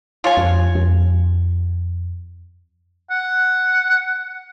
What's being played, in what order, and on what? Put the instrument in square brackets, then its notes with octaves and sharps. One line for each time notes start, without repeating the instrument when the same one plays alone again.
[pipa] F4 C#5 G#5
[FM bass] F2
F2
[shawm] F#5